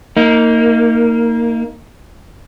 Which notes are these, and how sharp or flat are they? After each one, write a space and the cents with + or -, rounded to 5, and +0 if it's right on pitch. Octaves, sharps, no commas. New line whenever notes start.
A#3 -15 D#4 +20